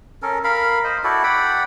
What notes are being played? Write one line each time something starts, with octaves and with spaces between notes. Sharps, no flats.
C#4 A4 A#4
A#4 F5 B5
C5 D#5
E4 F#4 A4 D5
D5 F#5 G5 B5